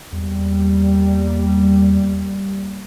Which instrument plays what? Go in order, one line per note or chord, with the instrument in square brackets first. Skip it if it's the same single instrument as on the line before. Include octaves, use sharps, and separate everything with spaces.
[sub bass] E2 [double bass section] G3 A#3